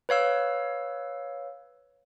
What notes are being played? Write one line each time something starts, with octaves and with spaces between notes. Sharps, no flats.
B4 C#5 F5 E6